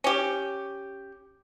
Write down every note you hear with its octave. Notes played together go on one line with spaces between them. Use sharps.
C#4 G4